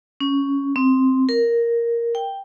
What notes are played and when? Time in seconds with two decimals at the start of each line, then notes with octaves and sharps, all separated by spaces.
0.21 C#4
0.76 C4
1.29 A#4
2.15 G5